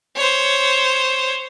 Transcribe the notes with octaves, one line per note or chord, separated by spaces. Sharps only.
C5 C#5